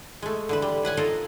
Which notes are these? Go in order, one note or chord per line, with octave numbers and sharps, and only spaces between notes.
G#3 A3
D3 E3 B4
G3
A2 B4 F#5 G#5
D#4 F4 A4 A#4